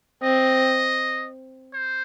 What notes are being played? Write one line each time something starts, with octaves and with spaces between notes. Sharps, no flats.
C4 D#5
C5